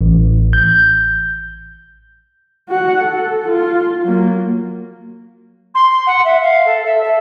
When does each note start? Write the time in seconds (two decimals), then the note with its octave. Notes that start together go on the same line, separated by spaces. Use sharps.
0.01 A1
0.53 G6
2.68 F#4 F#5
3.02 A4
3.48 F4
4.05 F#3 A#3
5.74 C6
6.06 F#5
6.24 E5
6.42 F5
6.65 A4
6.85 E5
7.03 A4